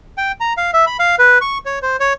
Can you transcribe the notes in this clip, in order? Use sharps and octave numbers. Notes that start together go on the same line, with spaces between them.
G5
A#5
F5
E5
B5
F5
B4
C#6
C#5
C5
C#5